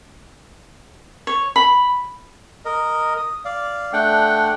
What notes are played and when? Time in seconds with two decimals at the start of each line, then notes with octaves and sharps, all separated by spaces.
1.27 C#5
1.56 B5
2.65 A#4 D#5
3.17 D#6
3.45 D5 F5
3.93 A3 D4 F#5 G5